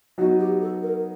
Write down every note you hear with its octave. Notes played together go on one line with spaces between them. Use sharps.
F#3 B3 D#4 F#4
G4
A4
A#4